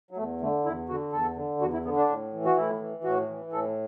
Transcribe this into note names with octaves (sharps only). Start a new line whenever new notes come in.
F#3
E2 A3
D3 A3
E2 E4
D3 F#4
E2 A4
D3
E2 F#4
E4
D3 B3
D4
A2
E3
F#4
A2 E4
E3
A2 F#4
E3
A2 A4